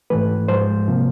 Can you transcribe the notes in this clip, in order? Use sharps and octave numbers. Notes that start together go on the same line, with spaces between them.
G#2 E3 A3 B4
G#2 F3 G#3 C5
C3 F3 A#3